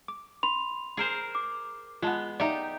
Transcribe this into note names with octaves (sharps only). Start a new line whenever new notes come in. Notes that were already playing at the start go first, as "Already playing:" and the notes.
D6
B5 C6 F7
G#4 A#4 C5
D6
G#3 B3 F4 A5
D#4 G4 D5 E5 A#5